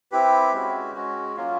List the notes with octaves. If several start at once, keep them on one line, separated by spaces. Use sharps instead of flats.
C4 E4 G4 B4
G#3 C#4 F#4
G#3 C#4 F#4
F#3 A#3 C#4 F4